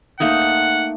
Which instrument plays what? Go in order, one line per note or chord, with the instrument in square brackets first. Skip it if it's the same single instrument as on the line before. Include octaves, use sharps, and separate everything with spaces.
[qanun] A3 A#3 D#4 [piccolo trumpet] F#5